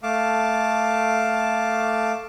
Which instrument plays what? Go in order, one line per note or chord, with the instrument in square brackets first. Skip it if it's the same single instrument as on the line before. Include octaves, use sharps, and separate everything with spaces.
[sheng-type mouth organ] A3 F5 A5 D6